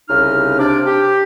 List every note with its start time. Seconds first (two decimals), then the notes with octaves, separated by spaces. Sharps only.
0.09 C2 C#3 D#4 F6
0.59 C3 D4 D6
0.86 G4